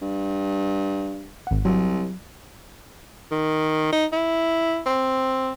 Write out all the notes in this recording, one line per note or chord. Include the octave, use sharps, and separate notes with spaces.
G2
G#1 F#5
C2 F#3
D#3
D#4
E4
C4